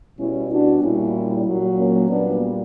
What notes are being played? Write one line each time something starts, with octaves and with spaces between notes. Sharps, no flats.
B2 G3 C#4 E4
D4 F#4
A#2 G3 C#4 E4
A#2 F#3
A#3 C#4
A#2 G3 B3 D4